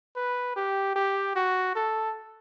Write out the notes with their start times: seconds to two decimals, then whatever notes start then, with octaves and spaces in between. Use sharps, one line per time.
0.16 B4
0.56 G4
0.95 G4
1.36 F#4
1.75 A4